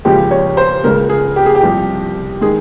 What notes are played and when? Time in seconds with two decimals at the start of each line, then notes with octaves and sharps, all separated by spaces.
0.05 D#2 C#3 F3 G#3 G4
0.31 C#5
0.57 C5
0.84 C#2 C#3 G#3 A#4
1.09 G#4
1.36 G4
1.46 G#4
1.55 G4
1.63 C2 C3 F3
2.41 D#3 G#3 G#4